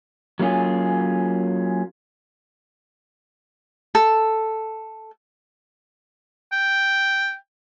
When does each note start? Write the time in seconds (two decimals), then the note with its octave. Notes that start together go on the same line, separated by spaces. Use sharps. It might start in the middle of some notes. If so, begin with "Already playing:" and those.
0.39 F#3 A#3 C#4 F4 G#4
3.95 A4
6.52 G5